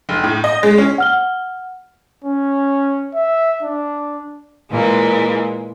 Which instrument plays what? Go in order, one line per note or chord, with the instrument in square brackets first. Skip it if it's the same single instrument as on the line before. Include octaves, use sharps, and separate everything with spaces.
[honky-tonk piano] F1
A2
D#5
G#3
C#4
[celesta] F#5 F6 G7
[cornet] C#4
E5
D4
[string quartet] A#2 E3 G#3 A#3